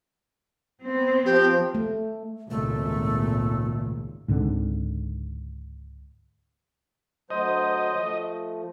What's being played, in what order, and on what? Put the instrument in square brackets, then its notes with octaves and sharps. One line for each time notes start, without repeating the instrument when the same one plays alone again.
[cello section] B3 C4
[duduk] F3 [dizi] G4
[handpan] A3
[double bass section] G#1 C#2 A#2 [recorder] A3
[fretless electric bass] C#2 G#2 D3 C4
[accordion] D2 F#3 C5 [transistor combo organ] D#5
[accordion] F3 A3